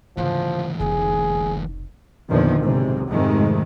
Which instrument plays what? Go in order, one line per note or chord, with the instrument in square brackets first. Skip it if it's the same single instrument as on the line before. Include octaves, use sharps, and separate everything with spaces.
[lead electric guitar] D2 E3 [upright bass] G#2 C#3 [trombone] F3
[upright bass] F1 B1 [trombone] G#4
[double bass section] E2 A#2 D3 D#3 F3
B1 G#2 C3
F2 G#2 C3 D#3 G#3 A3